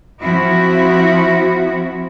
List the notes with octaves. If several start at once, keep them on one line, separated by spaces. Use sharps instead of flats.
F3 C4 E4 F#4